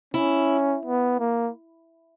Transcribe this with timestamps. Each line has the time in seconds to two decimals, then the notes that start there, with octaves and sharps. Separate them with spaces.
0.14 C#4 E4
0.85 B3
1.20 A#3